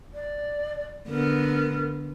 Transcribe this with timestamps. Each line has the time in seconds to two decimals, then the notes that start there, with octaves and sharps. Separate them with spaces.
0.14 D5
1.09 D3 B3 A#4